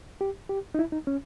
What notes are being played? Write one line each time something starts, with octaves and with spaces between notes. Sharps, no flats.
G4
G4
D#4
E4
D#4
C#4